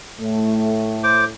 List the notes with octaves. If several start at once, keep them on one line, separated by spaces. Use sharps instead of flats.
A2 A3
C5 D6